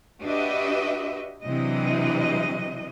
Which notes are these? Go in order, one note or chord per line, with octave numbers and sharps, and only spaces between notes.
D4 F#4 G4 B4 D#5 E5
C3 E3 F#3 D4 D#5